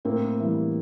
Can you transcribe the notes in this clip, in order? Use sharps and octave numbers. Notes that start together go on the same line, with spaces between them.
A2 A#3 C4
E3 G3